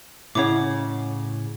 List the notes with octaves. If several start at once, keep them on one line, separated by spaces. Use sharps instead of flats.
A2 C#3 E4 C#5 D#5 F#5 D6